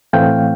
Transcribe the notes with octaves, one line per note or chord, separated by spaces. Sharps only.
A2 E3 A3 C4 F5 G5